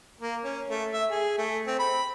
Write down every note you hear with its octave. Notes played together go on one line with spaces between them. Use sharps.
A#3
C#4
A3
E5
G#4
A3
C4
B5